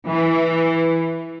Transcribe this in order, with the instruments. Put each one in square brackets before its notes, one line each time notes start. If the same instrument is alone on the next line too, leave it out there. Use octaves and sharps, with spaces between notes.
[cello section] E3